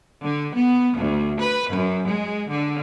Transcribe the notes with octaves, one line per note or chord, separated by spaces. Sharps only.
D3
B3
D2
B4
F#2
G#3
D3